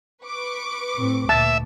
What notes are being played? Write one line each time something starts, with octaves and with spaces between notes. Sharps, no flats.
B4 C#6 D6
A2 C4
D2 A#2 E5 A5